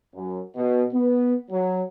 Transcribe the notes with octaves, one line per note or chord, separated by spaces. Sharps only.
F#2
B2
B3
F#3